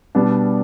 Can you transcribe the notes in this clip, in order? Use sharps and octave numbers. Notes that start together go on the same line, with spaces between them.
B2 G3 B3 D4